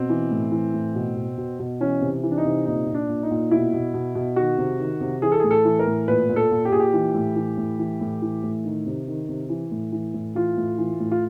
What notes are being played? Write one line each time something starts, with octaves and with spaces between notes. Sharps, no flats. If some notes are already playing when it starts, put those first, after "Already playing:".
Already playing: B2 C4
E3
A2
E3
A2
B2
B2
B2
B2
E3 C#4
C3
E3
D4
D#4
C3
A#2 D#4
A#2
D4
A#2
D#4
A#2
B2 E4
B2
B2
B2
D#3 F#4
C3
D#3
C3
E3 G#4
A4
A2 G#4
A4
E3
A#4
A2
A#2 B4
A#2
A4
A#2
G4
A#2 G#4
G4
E3
A2
E3
A2
E3
A2
E3
A2
D#3
C3
D#3
C3
E3
A2
E3
A2
E3 F4
A2
E3
A2
F4